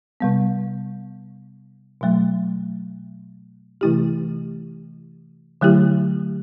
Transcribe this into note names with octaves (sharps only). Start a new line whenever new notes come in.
C3 G3 B3
B2 F#3 A3
C3 E3 A3 E4 G4
D3 F#3 A3 E4 G4